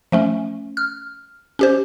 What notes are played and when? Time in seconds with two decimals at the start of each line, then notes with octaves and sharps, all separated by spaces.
0.12 F3 A3 C#4
0.77 F6
1.59 C#4 G4 C5